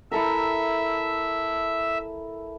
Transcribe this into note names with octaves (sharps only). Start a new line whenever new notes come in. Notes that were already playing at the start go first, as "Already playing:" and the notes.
E4 A4 A#4 E5